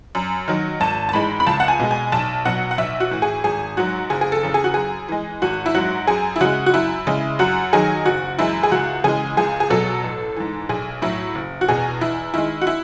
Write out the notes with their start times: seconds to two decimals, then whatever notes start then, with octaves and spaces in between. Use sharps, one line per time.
0.15 F#2
0.48 D#3 F#3
0.80 G#1 A5
1.09 A5
1.13 G#2 E3 G#3 B5
1.40 B5
1.47 C#2 A5
1.60 F#5
1.68 G#5
1.80 B2 G#3
1.91 G#5
2.12 B1 A5
2.45 B2 F#3 F#5
2.71 F#5
2.78 B1 E5
3.00 F#4
3.11 A2 E3
3.22 G#4
3.44 G#1 G#4
3.77 G#2 F#3 F#4
4.10 F#1 G#4
4.21 G#4
4.32 A4
4.43 E2 C#3
4.54 G#4
4.64 F#4
4.74 F#2 G#4
5.08 E3 G#3
5.42 G#1 F#4
5.66 E4
5.75 G#2 F#3 F#4
6.07 F#2 G#4
6.36 E4
6.41 C#3 G#3 F#4
6.66 F#4
6.74 F#2 E4
7.07 C#3 G#3
7.39 F#2 F#4
7.73 D#3 F#3 G#4
8.05 F#1 F#4
8.39 F#2 E3 G#3 E4
8.63 G#4
8.71 C#2 F#4
9.04 C#3 E3 G#3 G#4
9.37 C#2 G#4
9.60 G#4
9.70 B2 F#3 A4
10.04 A1
10.36 G#2 E3
10.69 B1 G#4
11.02 A2 F#3 E4
11.35 F#1
11.61 F#4
11.68 E2 B2 G#4
12.01 E2 E4
12.34 D#3 G#3 E4
12.61 F#4
12.67 E4